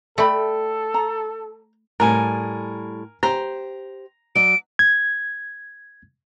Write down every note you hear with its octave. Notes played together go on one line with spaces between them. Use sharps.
A3 A4 D5 G5 B5
A#5
A2 G3 A#4 G#5
G4 C5 A#5
F#3 D5 D7
G#6